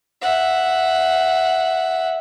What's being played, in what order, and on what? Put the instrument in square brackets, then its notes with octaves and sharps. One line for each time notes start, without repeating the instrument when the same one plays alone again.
[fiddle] E5 F#5